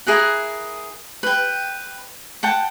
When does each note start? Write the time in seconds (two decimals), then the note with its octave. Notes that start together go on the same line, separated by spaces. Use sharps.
0.06 E4 G#4 A#4 F#5
1.23 B4 G5
2.43 F#5 G5 A5